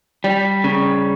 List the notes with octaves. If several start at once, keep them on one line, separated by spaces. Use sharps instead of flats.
G3
C#3